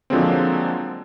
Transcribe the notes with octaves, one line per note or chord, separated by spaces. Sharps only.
D3 F3 F#3 G#3 A#3 C4